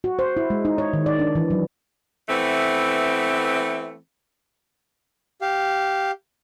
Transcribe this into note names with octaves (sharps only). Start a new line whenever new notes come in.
F#4
C5
E4
G#3
D#4
C#5
D#3
D5
D4
E3
F#3
E3 A3 B3 C4
G4 F5